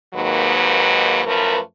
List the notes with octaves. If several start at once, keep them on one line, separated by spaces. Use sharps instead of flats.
D#2 G#2 D#3 F#3 A#3 B4
F#2 F3 A3 A#4 B4